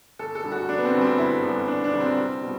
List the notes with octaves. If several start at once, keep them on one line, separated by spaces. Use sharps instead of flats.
G1 A4
A4
F#2 D3 G3
F#4
G1 D4
B3
C4
F#2 D3 G3
C4
G1 E4
F#2 D3 G3
G1 D4
D4
F#2 D3 G3
C4
C2
B2 G3